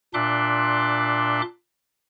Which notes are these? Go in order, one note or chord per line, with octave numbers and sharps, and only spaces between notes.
A#2 D4 E5 C6 D6 F#6